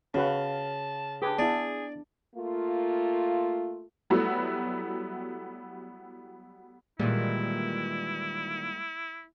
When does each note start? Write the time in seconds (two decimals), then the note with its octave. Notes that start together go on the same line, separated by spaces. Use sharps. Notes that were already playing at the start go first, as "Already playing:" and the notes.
0.14 C#3 C#4 F#4 B4 F5 A5
1.22 D4 G4 G#4 B4 A5 D6
1.39 B3 E4 G#4 D5
2.35 A3 A#3 F4
4.10 F#3 G3 A3 B3 E4 F#4
6.99 A#2 D#3 E3 G3 G#3 A#3 E4